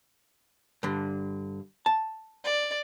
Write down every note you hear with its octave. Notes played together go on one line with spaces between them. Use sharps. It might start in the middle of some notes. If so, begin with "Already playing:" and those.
G2 D3
A5
D5